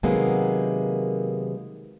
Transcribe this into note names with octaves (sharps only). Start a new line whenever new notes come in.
C3 D#3 F#3 G#3 A#3 B3